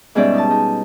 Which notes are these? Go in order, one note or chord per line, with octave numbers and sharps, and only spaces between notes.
G#2 B2 G3 C#4 D5 E5
D#4 A5
D#4